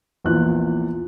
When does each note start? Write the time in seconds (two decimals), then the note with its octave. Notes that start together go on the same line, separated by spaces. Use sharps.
0.24 A#1 E2 A#2 F#6